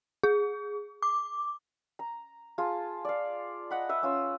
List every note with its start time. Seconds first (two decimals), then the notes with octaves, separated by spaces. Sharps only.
0.24 G#4
1.03 D6
1.99 A#5
2.58 F4 G#4 A5
3.05 D5 F5
3.71 D#5 F#5 B5
3.89 B4 E5
4.03 C#4 F4 E6